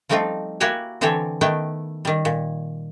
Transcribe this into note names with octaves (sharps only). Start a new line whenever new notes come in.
F3 G3 A3 C4 D#4 F4
A#3 E4 F#4 G4 C#5 G#5
D3 E3 C4 G4 A4 C#5
D#3 A3 B3 E4 G5
D#3 G3
A#2